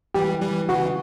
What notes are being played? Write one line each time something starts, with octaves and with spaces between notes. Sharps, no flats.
E3 G3 G4
E3 G3
C#3 E3 F#4